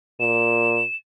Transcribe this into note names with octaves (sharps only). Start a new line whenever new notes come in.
A#2 E7